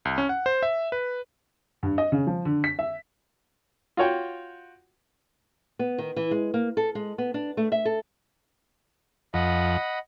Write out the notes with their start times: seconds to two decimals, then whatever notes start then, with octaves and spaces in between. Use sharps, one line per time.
0.05 C2
0.18 C#4
0.29 F#5
0.46 C5
0.63 E5
0.92 B4
1.83 G2
1.98 D#5
2.12 C#3
2.27 F3
2.45 D3
2.64 B6
2.79 E5
3.97 F4 F#4 C#5 G5
5.79 B3
5.98 D#3
6.16 E3
6.31 G#3
6.54 A#3
6.77 A4
6.95 G#3
7.18 B3
7.34 D4
7.57 A3
7.72 E5
7.85 A4
9.34 F2 D#5 F#5 B5